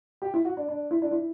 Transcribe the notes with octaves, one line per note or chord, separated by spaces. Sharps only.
G4
E4
F#4
D4
D4
E4
D4
E4